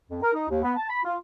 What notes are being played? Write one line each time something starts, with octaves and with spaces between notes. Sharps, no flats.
F2
A#4
D#4
D#2
B3
A5
B5
F4